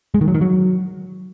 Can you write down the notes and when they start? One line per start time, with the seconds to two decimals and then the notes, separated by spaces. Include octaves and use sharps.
0.14 G#3
0.21 D#3
0.28 F#3
0.34 D#3
0.41 F#3